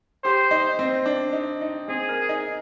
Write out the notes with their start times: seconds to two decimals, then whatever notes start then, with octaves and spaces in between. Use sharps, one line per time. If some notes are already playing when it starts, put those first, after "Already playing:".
0.24 G4 C5
0.51 D#4
0.79 C4
1.06 D4
1.33 D#4
1.61 D#4
1.88 C4 G#4
2.09 A#4
2.29 D#4